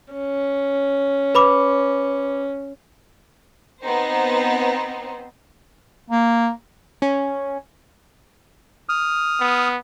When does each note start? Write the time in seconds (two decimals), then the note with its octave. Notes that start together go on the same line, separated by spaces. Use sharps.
0.14 C#4
1.35 B4 B5 D6
3.82 B3 C4 D#4 C5
6.10 A#3
7.02 C#4
8.89 D#6 F6
9.41 B3